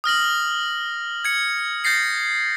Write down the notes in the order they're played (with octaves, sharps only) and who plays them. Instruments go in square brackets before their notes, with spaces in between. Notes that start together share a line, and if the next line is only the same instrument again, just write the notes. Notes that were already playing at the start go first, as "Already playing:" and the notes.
[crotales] D#6 F6 A#6 F#7
G#6 C#7
G6 A6 A#6 C7 C#7